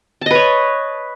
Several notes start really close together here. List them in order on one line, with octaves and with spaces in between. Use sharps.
A5 D#5 B4 C#5